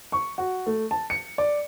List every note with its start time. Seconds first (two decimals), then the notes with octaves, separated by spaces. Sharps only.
0.12 C#6
0.38 F#4
0.66 A3
0.91 A5
1.10 C#7
1.38 D5